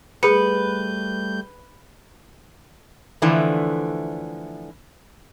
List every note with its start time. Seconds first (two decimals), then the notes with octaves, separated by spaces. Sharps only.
0.23 G3 A3 G#4 B4 G6 C#7
3.22 D3 E3 F3 A3